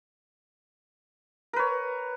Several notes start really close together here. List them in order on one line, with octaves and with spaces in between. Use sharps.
A#4 B4 C#5